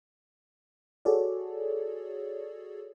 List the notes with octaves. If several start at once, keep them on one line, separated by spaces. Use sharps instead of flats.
F#4 G#4 A4 C#5 D5